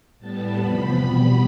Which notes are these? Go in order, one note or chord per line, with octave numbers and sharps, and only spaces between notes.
A2 G3 B3 A5
E2 C3 F3 B3 B5
E2 B2 G3 B3 B5